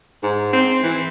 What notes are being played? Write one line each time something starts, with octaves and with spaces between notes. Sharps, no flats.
G#2
C4
E3